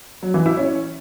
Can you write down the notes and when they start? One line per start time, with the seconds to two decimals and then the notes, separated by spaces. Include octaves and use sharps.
0.23 F#3
0.34 E3
0.46 E4
0.57 C#4